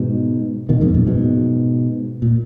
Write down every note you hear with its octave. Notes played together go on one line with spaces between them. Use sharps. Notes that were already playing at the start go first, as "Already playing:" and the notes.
Already playing: G#2 B2
B2 D#3
F2 G#2
F#2 A#2
G#2 B2
A#2